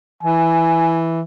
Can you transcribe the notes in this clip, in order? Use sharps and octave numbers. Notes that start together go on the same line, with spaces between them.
E3 G#5